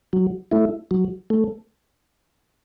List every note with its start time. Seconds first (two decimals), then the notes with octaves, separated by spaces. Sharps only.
0.13 F#3
0.51 A3 E4
0.91 F#3
1.30 A3